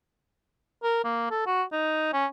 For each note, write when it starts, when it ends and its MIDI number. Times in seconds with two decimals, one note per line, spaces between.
0.83 0.99 70
1.04 1.27 58
1.31 1.44 69
1.46 1.63 66
1.72 2.08 63
2.13 2.26 61